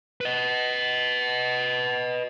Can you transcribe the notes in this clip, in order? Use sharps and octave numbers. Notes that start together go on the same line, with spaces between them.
B4 D#5